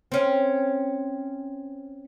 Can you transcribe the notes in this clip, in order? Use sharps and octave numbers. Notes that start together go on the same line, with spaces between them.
C4 C#4